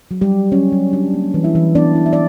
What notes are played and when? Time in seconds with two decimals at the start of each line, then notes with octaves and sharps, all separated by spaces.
0.11 F#3
0.21 G3 G4
0.31 F#3
0.52 F#3 C#4 C#5
0.72 F#3
0.93 D4
1.14 A#3
1.34 E3
1.44 E4 E5
1.55 E3
1.75 B3 D4 D5
1.95 E4
2.06 E5
2.13 D5